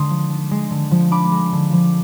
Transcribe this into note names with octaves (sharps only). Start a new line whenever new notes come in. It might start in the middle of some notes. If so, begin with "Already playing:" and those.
Already playing: D3 G#3 D4 C6 D#6
F3
D4
G#3
D3
F3
D4 B5 D6
G#3
D3
F3